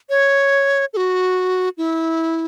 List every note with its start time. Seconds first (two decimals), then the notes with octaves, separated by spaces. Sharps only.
0.10 C#5
0.93 A4
0.97 F#4
1.78 E4